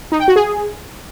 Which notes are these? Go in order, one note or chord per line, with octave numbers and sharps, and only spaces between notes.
D#4
G5
F#4
G#4